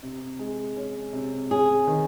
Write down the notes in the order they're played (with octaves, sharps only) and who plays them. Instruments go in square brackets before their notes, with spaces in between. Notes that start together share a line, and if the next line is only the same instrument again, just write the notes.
[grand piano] C3
G#3
C#4
C3
[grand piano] C#4 [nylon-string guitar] G#4
[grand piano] D#3